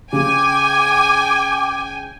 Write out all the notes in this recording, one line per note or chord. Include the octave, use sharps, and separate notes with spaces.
C#3 G5 G#5 D6